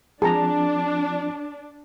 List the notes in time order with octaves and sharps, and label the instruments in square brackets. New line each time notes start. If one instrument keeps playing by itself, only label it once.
[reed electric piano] F3 C4 F4 [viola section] D4 [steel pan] G#4 A#5 [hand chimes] A5